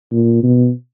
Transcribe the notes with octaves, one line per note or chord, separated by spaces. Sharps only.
A#2
B2